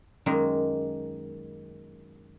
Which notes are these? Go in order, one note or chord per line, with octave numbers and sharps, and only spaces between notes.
F#2 D#3 G#3 A#3